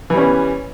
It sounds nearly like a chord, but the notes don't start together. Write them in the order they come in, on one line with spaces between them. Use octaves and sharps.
E3 G3 C#4 B3